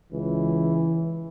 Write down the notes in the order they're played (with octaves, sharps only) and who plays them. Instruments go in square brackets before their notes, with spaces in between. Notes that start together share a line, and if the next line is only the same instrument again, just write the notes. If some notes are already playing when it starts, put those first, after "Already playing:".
[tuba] C#2 [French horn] E3